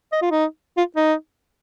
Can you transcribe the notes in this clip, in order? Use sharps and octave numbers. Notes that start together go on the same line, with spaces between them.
D#5
F4
D#4
F4
D#4